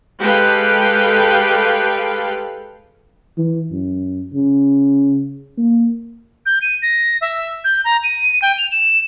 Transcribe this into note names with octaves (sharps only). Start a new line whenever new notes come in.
G#3 G4 A4 B4 F5 G5
E3
F#2
C#3
A#3
G6
D#7
A#6
E5
G6
A#5
D#7
G5
F7
E7